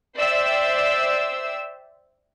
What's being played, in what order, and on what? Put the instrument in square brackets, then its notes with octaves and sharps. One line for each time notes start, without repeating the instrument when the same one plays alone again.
[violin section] C5 D5 E5 G5 E6